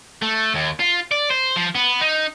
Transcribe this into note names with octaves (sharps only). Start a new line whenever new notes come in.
A3
D#2
F4
D5
C5
F3
B3
D#4